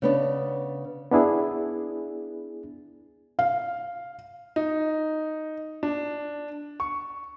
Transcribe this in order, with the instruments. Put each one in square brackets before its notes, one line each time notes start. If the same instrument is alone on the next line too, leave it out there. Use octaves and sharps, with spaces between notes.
[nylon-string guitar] C#3 B3 D4
[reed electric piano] B3 D4 E4 G#4
[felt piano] F5
[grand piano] D#4
D4
C#6